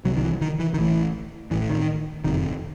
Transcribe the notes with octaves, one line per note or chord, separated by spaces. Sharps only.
C2 C3 F#3
D#3
E3
D#3
E3
D#3
A1 A2 E3
A1 A2 E3
D#3
F#1 F2 C3 D#3